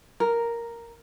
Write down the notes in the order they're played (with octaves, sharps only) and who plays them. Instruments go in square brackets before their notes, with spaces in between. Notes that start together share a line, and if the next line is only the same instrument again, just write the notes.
[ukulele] A#4